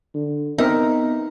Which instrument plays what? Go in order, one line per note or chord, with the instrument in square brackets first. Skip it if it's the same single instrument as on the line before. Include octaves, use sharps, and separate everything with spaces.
[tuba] D3
[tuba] B3 [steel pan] C4 A#4 E5 [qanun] D#4